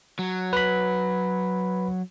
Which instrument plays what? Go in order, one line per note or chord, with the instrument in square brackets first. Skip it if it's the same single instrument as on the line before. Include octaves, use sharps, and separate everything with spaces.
[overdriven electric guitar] F#3
[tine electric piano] B4 B5